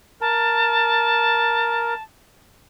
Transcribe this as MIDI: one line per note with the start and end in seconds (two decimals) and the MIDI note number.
0.21 1.94 70
0.21 2.02 81